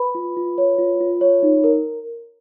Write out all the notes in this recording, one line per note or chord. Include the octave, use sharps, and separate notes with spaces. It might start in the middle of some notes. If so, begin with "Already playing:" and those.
Already playing: B4 B5
F4
F4
C#5
F4
F4
C#5
D#4
A#4